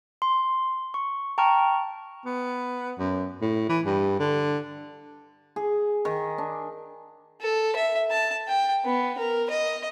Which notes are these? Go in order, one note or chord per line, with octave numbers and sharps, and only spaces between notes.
C6
C#6
G5 A5 A#5 C#6 F6
B3
F#2
A2
E3
G2
D3
G#4
D#3
D4
A4
E5
A5
G5
B3
A#4
D#5